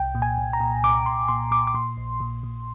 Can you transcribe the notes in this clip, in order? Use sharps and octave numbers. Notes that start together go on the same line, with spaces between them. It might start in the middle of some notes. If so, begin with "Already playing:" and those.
Already playing: C2 G5
A#2
G#5
C2
A#5
A#2
C2 D6
C2 C6
A#2 C6
A#2 D6
D6
A#2 C6
A#1
A#2
A#2